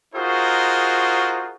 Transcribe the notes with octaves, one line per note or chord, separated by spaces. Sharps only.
D#4 F4 F#4 G#4 A#4 C5